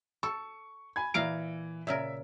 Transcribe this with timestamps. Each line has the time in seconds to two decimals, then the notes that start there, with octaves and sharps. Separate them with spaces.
0.23 A4 C#6
0.96 G#5 B5 G#6
1.14 A#2 E3 F5 A#5 D7
1.87 A#2 C#3 A#4 E5